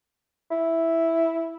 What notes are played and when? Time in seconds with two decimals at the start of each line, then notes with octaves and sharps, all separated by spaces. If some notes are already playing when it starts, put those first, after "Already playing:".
0.51 E4